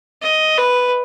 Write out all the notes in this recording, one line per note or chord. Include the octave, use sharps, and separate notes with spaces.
D#5
B4